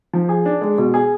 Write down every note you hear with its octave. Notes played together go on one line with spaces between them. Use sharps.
F3
G#4
D4
G#3
B2
G#4